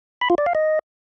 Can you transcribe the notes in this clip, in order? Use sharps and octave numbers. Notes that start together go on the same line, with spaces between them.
B5
F4
D5
F5
D#5